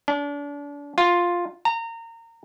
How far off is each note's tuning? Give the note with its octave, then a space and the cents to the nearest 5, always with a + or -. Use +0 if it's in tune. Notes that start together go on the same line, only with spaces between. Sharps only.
D4 -35
F4 +5
A#5 -25